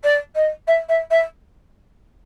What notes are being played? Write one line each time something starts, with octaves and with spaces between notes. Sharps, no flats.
D5
D#5
E5
E5
E5